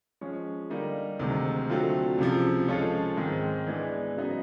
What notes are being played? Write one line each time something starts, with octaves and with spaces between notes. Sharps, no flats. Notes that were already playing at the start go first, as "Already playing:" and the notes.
F3 G#3 C#4
D3 G3 A#3 D#4
D2 C3 D#3 G#3
D3 F#3 A3 C4 F4
C#2 C3 F3
F3 G#3 C#4 F4 A4
G#2 D#3 G#3 C4
E3 G#3 B3 D4
C#3 F#3 B3 D#4